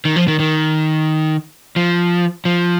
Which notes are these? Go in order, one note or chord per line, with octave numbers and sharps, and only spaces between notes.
D#3
F3
D#3
D#3
F3
F3